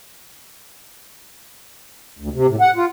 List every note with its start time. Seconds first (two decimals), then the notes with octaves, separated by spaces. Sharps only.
2.19 D2
2.34 C3
2.48 A2
2.61 F#5
2.76 F4